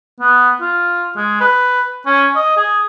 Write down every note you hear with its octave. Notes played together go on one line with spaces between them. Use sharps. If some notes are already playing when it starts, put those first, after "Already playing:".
B3
F4
G#3
B4
C#4
D#5
G#4